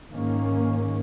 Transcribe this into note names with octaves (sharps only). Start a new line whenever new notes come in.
G#2 D#3 A#3 C#4